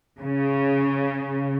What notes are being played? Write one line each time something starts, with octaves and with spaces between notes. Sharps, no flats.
C#3